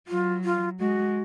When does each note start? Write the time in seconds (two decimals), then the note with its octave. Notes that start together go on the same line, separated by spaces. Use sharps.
0.08 F#3 F4
0.44 F4
0.79 G#3 F#4